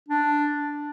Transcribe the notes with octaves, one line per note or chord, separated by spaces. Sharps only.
D4